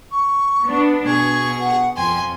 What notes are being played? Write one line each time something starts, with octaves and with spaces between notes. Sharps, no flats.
C#6
B3 D4
B2 G#4 C#6 G#6
F#5
F2 F3 G5 G#5 C6